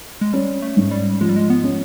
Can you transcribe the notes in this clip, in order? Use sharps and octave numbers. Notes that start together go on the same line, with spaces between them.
G#3
G3 C#4
A3
G#2
G3
F3 G#3
G3
G#3
B3
C#4